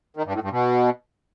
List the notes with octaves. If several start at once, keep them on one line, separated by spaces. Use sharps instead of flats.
D#3
G2
A2
G2
B2